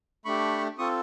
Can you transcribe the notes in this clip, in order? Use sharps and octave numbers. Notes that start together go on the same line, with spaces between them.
A3 D4 G4 B5 C#6
C4 F4 A4 C#6 D#6